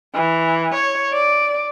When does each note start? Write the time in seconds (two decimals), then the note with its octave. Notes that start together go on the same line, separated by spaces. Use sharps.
0.14 E3
0.74 C#5
1.13 D5